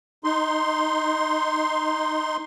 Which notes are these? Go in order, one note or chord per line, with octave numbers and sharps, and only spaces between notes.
D#4 C6